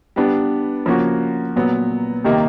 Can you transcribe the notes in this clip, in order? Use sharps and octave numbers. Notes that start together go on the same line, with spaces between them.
G3 B3 D4
F3 A#3 C#4 F#4
A#2 F#3 B3
C3 D#3 G3 A#3 D#4